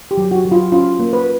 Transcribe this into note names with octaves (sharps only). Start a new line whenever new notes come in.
G4
F#3
F#4
F#3
F4
C#4 F4
A#3
B4